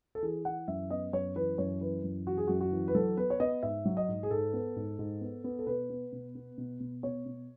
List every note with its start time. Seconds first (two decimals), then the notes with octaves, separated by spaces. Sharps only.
0.15 A4
0.22 E3 G#4
0.45 E3 F#5
0.68 F#2 E5
0.90 B3 D#5
1.13 F#2 C#5
1.35 E3 B4
1.58 F#2 C#5
1.81 E3 B4
2.04 F#2
2.27 E3 F#4
2.37 G#4
2.47 F#2 F#4
2.61 F#4
2.72 E3
2.88 B4
2.95 F#3 A4
3.17 B3 B4
3.30 C#5
3.40 B3 D#5
3.63 G#2 E5
3.85 F#3
3.97 D#5
4.08 G#2
4.23 G#4
4.31 G#2 A4
4.53 B3
4.76 G#2
4.99 G#2
5.21 B3
5.44 B3
5.59 A4
5.67 B2 B4
5.90 B3
6.12 B2
6.35 B3
6.58 B2
6.80 B2
7.03 B2 C#5
7.26 B2